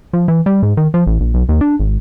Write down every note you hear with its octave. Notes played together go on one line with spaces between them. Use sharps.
F3
E3
G3
G#2
D#3
F3
A1
A#1
B1
D#2
D4
G#1